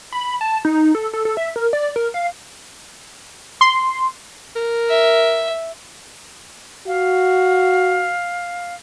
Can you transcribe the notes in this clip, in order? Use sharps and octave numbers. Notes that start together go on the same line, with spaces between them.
B5
A5
D#4
A4
A4
A4
E5
A#4
D5
A#4
F5
C6
A#4
E5
F#4 F5